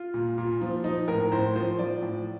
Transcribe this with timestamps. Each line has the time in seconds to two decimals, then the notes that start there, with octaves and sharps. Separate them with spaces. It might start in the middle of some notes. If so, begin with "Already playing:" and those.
Already playing: F4
0.14 A#2
0.38 A#2
0.61 F3
0.84 F3 D#4
1.08 A2 A#4
1.32 A2 C5
1.55 F3 C5
1.79 F3 D5
2.03 A2